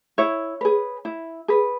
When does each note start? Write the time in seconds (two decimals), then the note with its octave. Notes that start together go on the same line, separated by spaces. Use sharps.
0.18 E4 C#5
0.61 G#4 B4
1.05 E4
1.48 G#4 B4